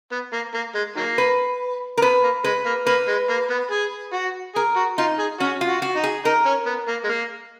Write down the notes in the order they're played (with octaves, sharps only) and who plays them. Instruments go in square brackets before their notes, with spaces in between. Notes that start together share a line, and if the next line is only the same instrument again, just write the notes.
[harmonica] B3
A#3
A#3
G#3
D#3 F#3 A#3
[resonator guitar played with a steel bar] B4
A#4
[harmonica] B3 [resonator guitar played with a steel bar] B4
[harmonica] A#3
[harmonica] G#3 [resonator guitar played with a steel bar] B4
[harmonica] A#3
[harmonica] A#3 [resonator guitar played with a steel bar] B4
[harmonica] G#3
A#3
B3
G#4
F#4
[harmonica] G#4 [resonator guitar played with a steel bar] A#4
[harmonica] F#4
[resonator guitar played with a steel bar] D#4 [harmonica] F4
[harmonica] G#4
[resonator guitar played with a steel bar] C#4 [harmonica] F#4
[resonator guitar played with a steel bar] F4
[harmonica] F#4
[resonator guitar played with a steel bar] F#4
[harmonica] D#4
[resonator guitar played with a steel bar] G#4
[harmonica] D#4 [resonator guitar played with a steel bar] A#4
[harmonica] C#4
B3
A#3
G#3
A#3